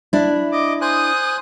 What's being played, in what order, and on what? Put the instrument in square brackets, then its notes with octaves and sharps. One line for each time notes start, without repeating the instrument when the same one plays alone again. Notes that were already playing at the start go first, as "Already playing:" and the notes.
[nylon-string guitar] D4 E4
[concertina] D#5 [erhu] D6
[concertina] C5 G#5 F#6 [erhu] D#6